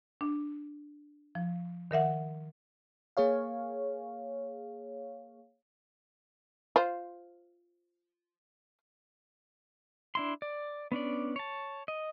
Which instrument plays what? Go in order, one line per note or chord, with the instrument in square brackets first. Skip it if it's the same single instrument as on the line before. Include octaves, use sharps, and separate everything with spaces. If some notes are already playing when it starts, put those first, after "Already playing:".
[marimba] D4
F3
D#3 A#4 E5 F#5
[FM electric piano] A#3 G#4 C#5 F5
[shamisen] F4 C5
[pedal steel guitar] D4 E4 C6
D5
B3 C#4 D4 D5
C#5 A5
D#5